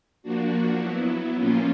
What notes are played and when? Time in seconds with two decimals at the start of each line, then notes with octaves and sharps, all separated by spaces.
0.23 F3 A#3 D4 F#4
0.78 F#3 B3 E4
1.35 A#2 F3 A#3 C#4 F4